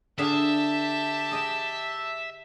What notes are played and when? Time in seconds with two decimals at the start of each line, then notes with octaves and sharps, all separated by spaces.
0.18 D3 G4 G#4 E5 F5 A5
1.31 G#4 D#5 G5